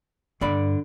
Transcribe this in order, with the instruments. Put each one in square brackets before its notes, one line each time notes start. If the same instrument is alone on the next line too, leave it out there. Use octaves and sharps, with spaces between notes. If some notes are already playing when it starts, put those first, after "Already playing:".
[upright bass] G2 [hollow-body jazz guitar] D3 D5 B5